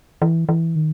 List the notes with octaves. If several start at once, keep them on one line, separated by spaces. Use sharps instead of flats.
E3
E3
D#3